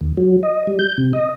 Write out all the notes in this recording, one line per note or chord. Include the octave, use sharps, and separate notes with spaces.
D#2
F#3
D#5
G3
G6
C3
D#5